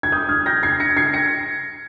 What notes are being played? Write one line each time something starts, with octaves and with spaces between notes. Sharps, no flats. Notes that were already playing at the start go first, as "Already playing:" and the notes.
G#6
D#6 G6
F6 G#6
G6 A#6
G#6 C7
A#6 C#7
G#6 C7
A#6 C#7